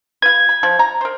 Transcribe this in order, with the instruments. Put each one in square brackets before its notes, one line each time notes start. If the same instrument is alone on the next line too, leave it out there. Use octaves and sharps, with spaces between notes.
[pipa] F4 B4 [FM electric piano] G#6
[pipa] B5
F3
A#5
A#4 C5